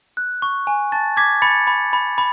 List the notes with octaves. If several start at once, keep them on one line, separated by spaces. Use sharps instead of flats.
F#6
C#6
G#5
A5 A6
D6 G#6 B6
B5 A6 C#7
B5
B5
B5